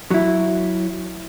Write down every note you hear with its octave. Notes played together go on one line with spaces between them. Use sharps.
F#3 E4